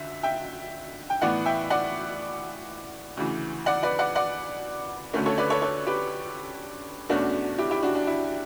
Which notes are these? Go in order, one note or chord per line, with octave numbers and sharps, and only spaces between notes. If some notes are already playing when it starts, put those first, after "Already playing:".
Already playing: D2 D3 E5
E5 G5
G5
A2 E3 B3 D5 F#5
E5 G5
D5 F#5
D2 C#3 E3
D5 F#5
B4 D5
D5 F#5
D5 F#5
D2 D3 A3 C#4
A4 C#5
B4 D5
A4 C#5
A4 C#5
G4 B4
E2 B2 A3 C#4 D4 F#4
E4 G4
E4 G4
D4 F#4
D4
E4